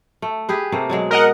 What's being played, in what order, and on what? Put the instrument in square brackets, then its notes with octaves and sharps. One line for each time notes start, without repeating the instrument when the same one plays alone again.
[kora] A3
G4 G#4 B4
C3 A3 A#3
B2 F#3 G#3
[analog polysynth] A#4 D#5 F#5